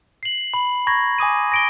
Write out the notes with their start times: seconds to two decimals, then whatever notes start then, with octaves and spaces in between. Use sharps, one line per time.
0.23 C7 F#7
0.54 B5
0.87 A#5 B5 C#6 G#6 A#6
1.18 G#5 D6 D#6 D#7
1.52 A#6 D7 G7